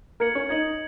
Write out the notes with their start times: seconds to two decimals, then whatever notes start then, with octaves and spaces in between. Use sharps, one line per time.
0.20 A#3 A#4 G#6 C#7 F#7
0.35 C#4 C#5
0.49 D#4 D#5 G#6 C#7 F#7